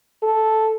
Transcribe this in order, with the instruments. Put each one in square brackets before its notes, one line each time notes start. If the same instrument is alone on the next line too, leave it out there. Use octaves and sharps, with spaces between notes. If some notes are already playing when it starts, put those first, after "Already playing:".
[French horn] A4